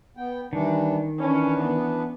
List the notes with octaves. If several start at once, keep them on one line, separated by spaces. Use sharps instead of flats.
B3 G5
D#3 E3 G3 D4
E3 C#4 D4 B4
B3